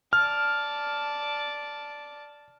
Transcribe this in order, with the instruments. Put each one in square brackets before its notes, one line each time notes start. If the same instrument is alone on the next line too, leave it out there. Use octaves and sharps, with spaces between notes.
[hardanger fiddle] D5 A5 [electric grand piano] F6